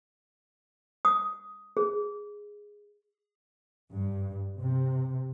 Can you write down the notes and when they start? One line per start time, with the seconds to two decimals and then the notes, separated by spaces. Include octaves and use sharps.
1.05 D#6
1.77 G#4
3.92 G2
4.58 C3